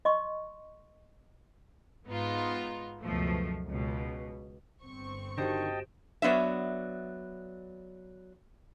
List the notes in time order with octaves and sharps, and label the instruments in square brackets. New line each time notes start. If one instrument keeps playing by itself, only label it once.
[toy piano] D#5 C6 C#6
[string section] G#2 B3 D#4 F4
C#2 F#2 B2 F3 A3
C#2 B2
G1 C4 C#6
[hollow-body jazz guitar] D3 D#3 [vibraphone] F#4 G4 C5 [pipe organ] D#5 G5 A5
[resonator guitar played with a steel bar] F#3 B3 D4 E5